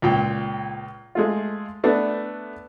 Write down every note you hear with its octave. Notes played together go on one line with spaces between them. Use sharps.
C#2 A#2 G5
G#3 A3 F4
A3 B3 D4